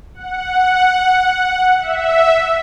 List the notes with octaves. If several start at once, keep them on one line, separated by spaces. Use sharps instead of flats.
F#5
E5